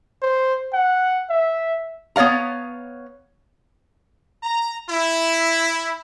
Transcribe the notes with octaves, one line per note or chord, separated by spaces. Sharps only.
C5
F#5
E5
B3 C#5 D5 F5 A#5
A#5
E4